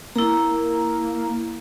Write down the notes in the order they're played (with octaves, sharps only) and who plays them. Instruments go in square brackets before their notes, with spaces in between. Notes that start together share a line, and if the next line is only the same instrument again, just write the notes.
[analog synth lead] A#3 [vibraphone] E4 A#5